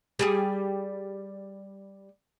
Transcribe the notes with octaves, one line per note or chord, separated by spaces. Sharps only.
G3 G4 G#4